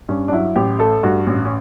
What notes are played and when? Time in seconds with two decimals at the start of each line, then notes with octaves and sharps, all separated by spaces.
0.09 G2 C#4
0.28 D4
0.32 F#3 E4
0.56 A1 G4
0.79 A3 A4
1.03 G2 F#4
1.27 A1
1.45 C#4